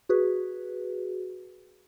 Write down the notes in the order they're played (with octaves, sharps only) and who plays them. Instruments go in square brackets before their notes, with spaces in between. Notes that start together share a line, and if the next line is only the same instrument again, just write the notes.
[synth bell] F#4 G#4 B4